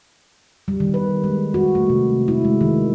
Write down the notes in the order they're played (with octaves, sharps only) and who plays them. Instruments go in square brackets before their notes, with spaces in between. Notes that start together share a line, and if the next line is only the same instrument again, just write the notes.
[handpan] G3
D#3
B4
G#3
F#4
A3
C3
E4
G#3
D#3